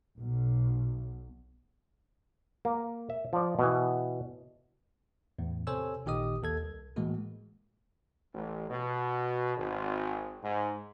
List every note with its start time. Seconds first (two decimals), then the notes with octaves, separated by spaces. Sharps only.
0.18 B1
2.65 A#3
3.10 E5
3.33 F3 D5
3.59 B2 E3
5.39 E2 A2
5.67 C3 A4 C5 C#5 G#5 E6
6.05 A1 A#2 D#3 G4 D#5 D#6
6.43 D#2 A4 G#6
6.63 C2
6.96 A2 E3 G#3 A#3 F#4
8.34 A1
8.70 B2
9.56 G#1
10.42 G#2